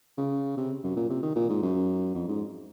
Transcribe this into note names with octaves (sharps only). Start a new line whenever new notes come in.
C#3
C3
F#2
A#2
C3
D#3
A#2
G#2
F#2
F2
G#2